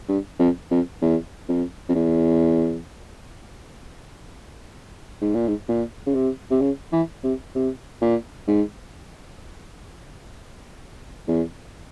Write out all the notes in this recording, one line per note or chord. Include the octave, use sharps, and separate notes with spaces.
G2
F2
F2
E2
F2
F2
E2
G#2
A#2
G#2
A#2
C#3
C3
C3
C#3
E3
C3
C3
A#2
G#2
E2